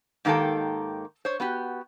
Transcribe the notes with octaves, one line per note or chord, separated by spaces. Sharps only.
G#2 D#3 A#3 G4 A4
C5 C#5
B3 F#4 G4